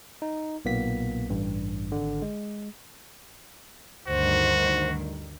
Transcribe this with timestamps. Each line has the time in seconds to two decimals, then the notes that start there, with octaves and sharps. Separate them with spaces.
0.22 D#4
0.65 B1 A#2 A#3 B3 B6
1.29 A1 G2
1.92 G#1 D3
2.22 G#3
4.07 D2 G2 D#3 F#4 C5